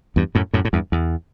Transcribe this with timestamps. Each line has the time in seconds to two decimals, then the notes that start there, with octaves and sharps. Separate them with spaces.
0.16 E2 G2
0.35 F#2 A2
0.53 F#2 A2
0.65 A2
0.73 E2 G2
0.92 E2